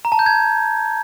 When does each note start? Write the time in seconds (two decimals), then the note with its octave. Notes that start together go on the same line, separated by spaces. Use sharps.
0.05 A#5
0.12 A5
0.19 G6
0.26 G#6